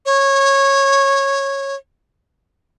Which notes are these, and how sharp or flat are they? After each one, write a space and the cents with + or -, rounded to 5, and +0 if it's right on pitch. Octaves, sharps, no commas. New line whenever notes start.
C#5 -15